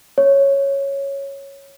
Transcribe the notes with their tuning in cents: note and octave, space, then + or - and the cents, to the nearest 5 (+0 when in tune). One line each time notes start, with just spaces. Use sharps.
C#5 -5